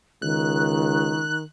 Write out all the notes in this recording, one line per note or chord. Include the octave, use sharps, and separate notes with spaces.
C#2 D#3 F#6